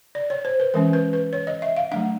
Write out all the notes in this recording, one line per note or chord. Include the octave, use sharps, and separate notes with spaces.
D5
C#5
C5
B4
E3 G#3 C#4 A#4
B4
B4
C#5
D#5
E5
F5
F#3 A3 D4 F#5